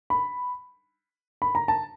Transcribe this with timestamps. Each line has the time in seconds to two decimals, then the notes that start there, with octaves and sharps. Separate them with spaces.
0.10 B5
1.42 B5
1.55 A#5
1.68 A5